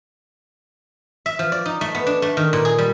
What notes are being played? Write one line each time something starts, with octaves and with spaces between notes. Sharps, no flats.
E5
F3
D5
D#4
A3
B3
D4
A3
D#3
A#2
G#4
G3